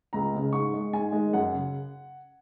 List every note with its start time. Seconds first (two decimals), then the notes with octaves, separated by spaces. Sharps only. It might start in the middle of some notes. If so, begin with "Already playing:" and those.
0.13 C#2 A#5
0.34 C#3 G#3
0.53 G#2 C#6
0.74 G#3
0.93 G#2 G#5
1.12 D#3 G#3
1.33 F#2 F#5
1.53 C#3